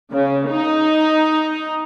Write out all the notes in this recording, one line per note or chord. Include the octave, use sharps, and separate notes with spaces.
C#3
D#4